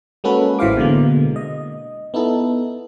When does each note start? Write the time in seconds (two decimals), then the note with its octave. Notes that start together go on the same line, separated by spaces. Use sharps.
0.24 G#3 A#3 C#4 F#4 A4 B4
0.59 A1 E3 C5 F5 D6
0.77 B2 D3 G#3 A#3
1.36 D#5
2.14 B3 D#4 E4 A4